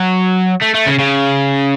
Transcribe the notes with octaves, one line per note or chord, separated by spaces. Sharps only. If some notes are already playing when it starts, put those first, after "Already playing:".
Already playing: F#3
A3
A3
C#3
C#3